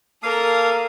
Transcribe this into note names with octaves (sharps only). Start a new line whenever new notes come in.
A#3 A4 A#4 F5 D#6